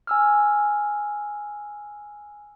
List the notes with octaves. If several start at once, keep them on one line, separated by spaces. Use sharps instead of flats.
G#5 E6 F6